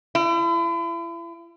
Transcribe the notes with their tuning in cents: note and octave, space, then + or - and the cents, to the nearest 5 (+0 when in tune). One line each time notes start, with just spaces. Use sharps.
E4 +40